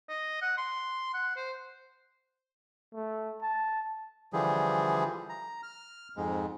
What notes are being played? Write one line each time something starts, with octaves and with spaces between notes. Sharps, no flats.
D#5
F#5
C6
F#5
C5
A3
A5
D3 E3 F3 G3 G#4
A#5
F6
F2 G#2 G#3